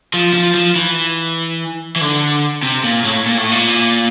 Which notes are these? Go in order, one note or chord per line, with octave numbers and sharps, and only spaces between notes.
F3
F3
F3
E3
E3
D3
C3
A#2
A2
A#2
A2
A#2